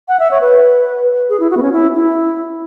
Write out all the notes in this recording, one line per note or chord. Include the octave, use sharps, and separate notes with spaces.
F#5
E5
C#5
B4
G#4
E4
F#4
B3
C#4
E4
E4